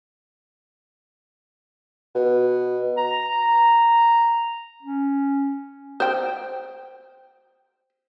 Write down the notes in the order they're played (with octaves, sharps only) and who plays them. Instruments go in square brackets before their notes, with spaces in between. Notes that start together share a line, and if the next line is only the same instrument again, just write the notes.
[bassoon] B2
[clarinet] A#5
C#4
[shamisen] C5 G5